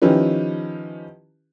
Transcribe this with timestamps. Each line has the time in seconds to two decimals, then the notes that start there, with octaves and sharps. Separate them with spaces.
0.02 D#3 F3 C#4 E4 G4 B4